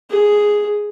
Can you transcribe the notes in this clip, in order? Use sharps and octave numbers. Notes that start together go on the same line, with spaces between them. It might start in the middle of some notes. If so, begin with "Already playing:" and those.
G#4